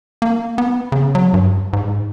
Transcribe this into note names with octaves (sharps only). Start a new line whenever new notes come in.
A#3
B3
C#3
F#3
G2
G#2